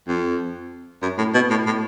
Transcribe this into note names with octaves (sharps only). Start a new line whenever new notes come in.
F2
F#2
A2
B2
A2
A2